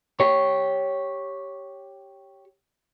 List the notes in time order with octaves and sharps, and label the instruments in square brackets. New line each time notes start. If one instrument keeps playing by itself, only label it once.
[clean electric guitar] G4 C#5